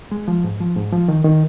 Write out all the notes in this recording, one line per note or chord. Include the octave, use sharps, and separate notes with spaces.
G#3
F3
G#2
F3
G#2
F3
D#3
D#3